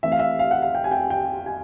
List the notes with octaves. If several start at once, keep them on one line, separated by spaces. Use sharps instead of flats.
E3 A3 C4 E5
F5
E5
F5
F#5
F5
G5
G#5
G5
G5
G#5